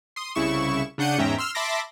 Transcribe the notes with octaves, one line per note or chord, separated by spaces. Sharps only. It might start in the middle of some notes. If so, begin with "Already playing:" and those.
C6 D#6
C2 C#3 E4 C#6 E7
C#3 D4 F#5 G6 C#7 D#7
E2 G#2 C#4 E5 G5 A#5
C6 E6 F6
E5 A5 B5 C6 D6 A#6